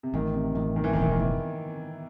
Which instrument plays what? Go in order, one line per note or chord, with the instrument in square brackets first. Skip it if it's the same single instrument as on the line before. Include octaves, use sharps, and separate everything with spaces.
[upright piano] C3
[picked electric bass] A1 [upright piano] D#3
[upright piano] C3
[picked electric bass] A1 [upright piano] D#3
[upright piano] D#3
E3
[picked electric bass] E1 [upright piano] D#3
[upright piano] E3
D#3
E3